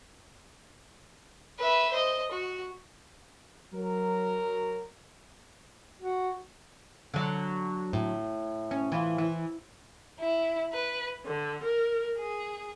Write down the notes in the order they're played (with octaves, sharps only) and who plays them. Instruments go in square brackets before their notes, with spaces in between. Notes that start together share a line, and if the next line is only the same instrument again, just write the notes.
[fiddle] B4 E5
C5 D#5
F#4
[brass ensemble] F#3 A#4
[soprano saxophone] F#4
[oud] D3 F#3
[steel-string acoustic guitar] A2
[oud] C#4
E3 F4
E3
[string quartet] E4
B4
D3
A#4
G#4